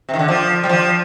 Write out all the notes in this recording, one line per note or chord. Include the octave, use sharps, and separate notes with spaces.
C3
D#3
D3
F3
G3
F3